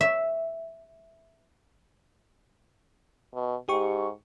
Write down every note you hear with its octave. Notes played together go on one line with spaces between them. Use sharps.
E5
B2
G#2 G4 C#6